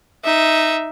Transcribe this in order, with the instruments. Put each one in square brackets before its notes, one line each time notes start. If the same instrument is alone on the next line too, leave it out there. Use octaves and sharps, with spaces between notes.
[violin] D#4 E5